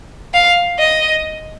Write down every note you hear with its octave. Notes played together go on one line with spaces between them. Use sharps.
F5
D#5